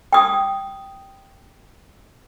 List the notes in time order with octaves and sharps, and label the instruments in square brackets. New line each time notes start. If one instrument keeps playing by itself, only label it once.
[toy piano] G5 D#6